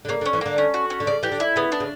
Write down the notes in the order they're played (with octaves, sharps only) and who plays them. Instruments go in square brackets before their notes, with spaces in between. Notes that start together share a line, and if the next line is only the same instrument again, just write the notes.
[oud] D3
[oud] C#3 [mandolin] A#3
[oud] D3
[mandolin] C#4
[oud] E3
[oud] D3 [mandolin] A#3
[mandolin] C#4
F#4
C#4
[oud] D3
[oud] C#3 [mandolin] D5
[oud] E3 [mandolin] G4
[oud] D3
[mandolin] E4
[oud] C#3 [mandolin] B3
[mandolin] D4
[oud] C#3